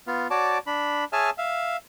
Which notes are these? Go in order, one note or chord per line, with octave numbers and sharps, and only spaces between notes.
B3 F4
F#4 C#5 D5 A5 D6
D4 B5
G#4 C#5 E5 G#5 A5 F6
E5 F5